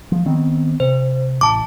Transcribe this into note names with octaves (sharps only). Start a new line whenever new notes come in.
F3
D#3 B3 C4
C3 C5
A1 A5 D6